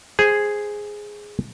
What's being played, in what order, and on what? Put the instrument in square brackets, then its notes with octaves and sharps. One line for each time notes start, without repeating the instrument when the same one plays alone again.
[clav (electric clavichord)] G#4 C5